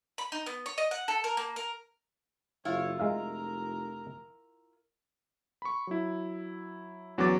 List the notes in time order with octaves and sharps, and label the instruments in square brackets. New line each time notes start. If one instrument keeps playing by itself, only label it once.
[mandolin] B5
D#4
B3
C#5
D#5
F#5
A4
A#4
A#3
A#4
[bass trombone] F#1 [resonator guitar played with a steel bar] E4 F4 [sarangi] C#5
[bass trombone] F1 [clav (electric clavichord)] G#3 E5 F5 [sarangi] A#4
[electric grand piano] B5 C#6
F#3 E4
E2 F#3 C#4 B4 D6 A6